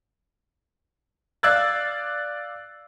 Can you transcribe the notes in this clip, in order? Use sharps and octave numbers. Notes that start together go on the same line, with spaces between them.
D5 F5 E6 F#6 G#6 A6